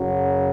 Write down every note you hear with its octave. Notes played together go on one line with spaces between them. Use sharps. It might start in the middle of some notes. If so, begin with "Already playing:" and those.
Already playing: F#2 C#3 F#3